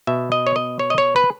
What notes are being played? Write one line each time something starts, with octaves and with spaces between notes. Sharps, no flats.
B2 E5
D#5
C#5
D#5
C#5
D#5
C#5
B4